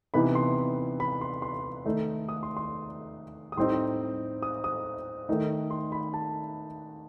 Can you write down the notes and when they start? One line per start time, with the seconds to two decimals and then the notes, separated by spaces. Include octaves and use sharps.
0.14 C3 E3 B3 D#4 B5
0.35 C6
1.00 B5
1.21 C6
1.42 C6
1.86 D#3 A3 D#4
2.29 D#6
2.43 C6
2.57 C6
3.52 D#6
3.57 A2 G3 C4 D#4 C6
4.42 D#6
4.64 D#6
5.29 D#3 A3 D#4
5.71 C6
5.92 B5
6.14 A5